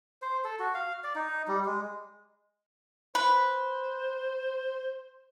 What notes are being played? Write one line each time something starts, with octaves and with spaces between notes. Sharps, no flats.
C5
A4
F#4
F5
D5
D#4
G3
G#3
B4 C5